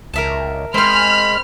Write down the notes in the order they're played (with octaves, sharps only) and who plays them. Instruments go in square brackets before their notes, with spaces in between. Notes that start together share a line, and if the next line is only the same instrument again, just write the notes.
[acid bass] C#2 [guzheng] A#4 E5 A5
[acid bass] G#3 [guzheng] C4 C5 [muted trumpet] B5 [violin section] F6